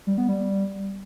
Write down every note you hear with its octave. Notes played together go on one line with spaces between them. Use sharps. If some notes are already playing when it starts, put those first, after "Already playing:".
G3
B3
G3